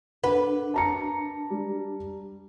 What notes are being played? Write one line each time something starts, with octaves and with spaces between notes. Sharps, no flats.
D4 A#4 B4 F#5
A5 A#5 C#7
G3